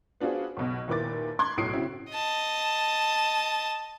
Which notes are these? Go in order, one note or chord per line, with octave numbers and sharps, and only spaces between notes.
B3 D4 F4 F#4 G#4 C5
B1 B2
D#2 A#2 E4 B4 D6 A6
B5 C6 D6 F#6 G#6
B1 A2 D#6 C7 D7
C#3 C4 E4 F#4
D#5 A5